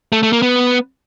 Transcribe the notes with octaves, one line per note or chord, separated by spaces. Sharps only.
A3
A3
A#3
B3